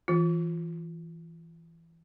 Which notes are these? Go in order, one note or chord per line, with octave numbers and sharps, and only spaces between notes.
E3 F4